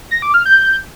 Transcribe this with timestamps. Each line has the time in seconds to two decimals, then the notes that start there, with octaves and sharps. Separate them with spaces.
0.11 A#6
0.22 D6
0.34 F6
0.45 G6